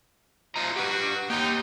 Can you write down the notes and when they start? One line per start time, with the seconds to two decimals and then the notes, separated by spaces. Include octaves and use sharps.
0.56 F3 F4 D#5 A#5
0.76 F#4 G4 B4
1.30 A#3 D#4 G4 G5